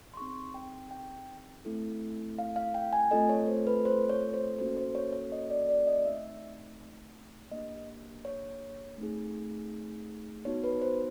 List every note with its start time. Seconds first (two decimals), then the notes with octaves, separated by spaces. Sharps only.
0.14 C6
0.17 C4 D#4 G#4 C#6
0.54 G5
0.91 G5
1.65 A3 C4 E4 A4
2.39 F5
2.56 F5
2.74 G5
2.93 G#5
3.11 A3 C4 F4 A4 D#5
3.29 C#5
3.48 C5
3.67 B4
3.85 C5
4.09 C#5
4.34 C5
4.58 A#3 C#4 F#4 A4 C5
4.77 C5
4.95 C#5
5.13 C#5
5.32 D#5
5.50 D5
5.69 D5
5.87 D#5
6.05 A3 C4 D#4 E5
7.51 A#3 D4 G4 D#5
8.25 C#5
8.98 A3 C4 D#4 G#4
10.45 B3 D#4 F#4 C#5
10.64 B4
10.82 C5